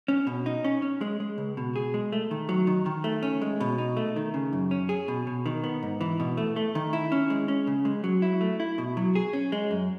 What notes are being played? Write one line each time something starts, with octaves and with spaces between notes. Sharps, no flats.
C#4
B2
D#4
C#4
C#4
G#3
G#3
C#2
B2
G#4
G#3
A3
D#3
F#3
D#3
D#3
A3
C#4
G#3
B2
D#4
A3
D#3
C#3
F#2
C#4
G#4
B2
B2
D#3
B3
G#2
E3
B2
A3
A3
D#3
E4
C#4
G#3
C#4
C#3
G#3
F#3
E4
A3
E4
B2
F#3
G#4
C#4
G#3
F#2